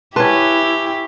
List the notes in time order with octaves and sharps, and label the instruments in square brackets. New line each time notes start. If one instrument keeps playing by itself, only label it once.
[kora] C#4 B4 [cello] E4 [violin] G4 [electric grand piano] A5 C6